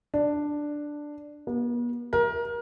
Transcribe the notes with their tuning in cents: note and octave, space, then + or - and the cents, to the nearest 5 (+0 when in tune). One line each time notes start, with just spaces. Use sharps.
D4 +5
B3 -45
A#4 +25